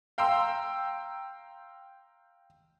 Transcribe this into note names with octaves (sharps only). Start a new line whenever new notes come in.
F5 G5 A#5 C6 E6